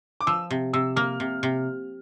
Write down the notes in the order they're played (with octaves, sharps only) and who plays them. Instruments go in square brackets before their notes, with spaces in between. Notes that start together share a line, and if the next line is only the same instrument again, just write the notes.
[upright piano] D6
[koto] F3 [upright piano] E6
[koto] C3
[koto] C3 [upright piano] E6
[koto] A#3 [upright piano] F6
[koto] C3
C3